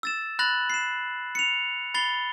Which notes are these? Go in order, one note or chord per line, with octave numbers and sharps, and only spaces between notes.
E6 A6 E7
B5 F#6 A6 A#6 F#7
C7 E7
C#7 F7
B5 A6 C7 G7